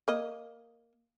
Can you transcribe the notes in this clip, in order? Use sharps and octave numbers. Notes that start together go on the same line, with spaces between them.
A#3 D#5